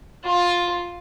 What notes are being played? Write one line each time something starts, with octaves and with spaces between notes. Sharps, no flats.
F4